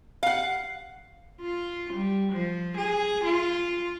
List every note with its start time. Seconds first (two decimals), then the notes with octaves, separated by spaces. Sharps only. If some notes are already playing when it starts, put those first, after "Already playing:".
0.23 F5 F#5
1.41 F4
1.93 G3
2.33 F3
2.77 G#4
3.24 F4